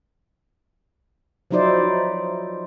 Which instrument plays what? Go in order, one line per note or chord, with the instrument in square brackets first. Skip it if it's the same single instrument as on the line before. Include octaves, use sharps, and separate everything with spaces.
[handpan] F3 F#3 D#4 E4 C5 D5